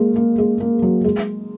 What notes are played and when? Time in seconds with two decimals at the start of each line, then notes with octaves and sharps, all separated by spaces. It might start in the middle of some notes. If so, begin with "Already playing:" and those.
Already playing: G#3 A#3
0.16 A#3
0.38 G#3
0.60 A#3
0.82 F#3
1.04 G#3